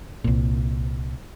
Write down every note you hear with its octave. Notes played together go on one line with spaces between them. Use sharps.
C2 A#2